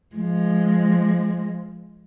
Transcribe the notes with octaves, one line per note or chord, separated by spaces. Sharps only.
F3 G#3